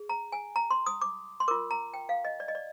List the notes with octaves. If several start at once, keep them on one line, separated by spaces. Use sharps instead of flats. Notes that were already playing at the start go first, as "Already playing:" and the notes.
Already playing: G#4
A#5
G#5
A#5
C6
D#6
D6
C6
F4 A#4 D6
A#5
G5
F5
D#5
D5
D#5
D5